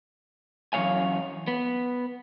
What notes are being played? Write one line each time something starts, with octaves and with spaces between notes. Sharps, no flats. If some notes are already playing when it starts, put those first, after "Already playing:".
F#2 E3 F3 C#5 F5 G#5
B3